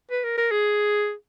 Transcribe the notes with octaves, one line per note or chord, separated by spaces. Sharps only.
B4
A#4
A#4
G#4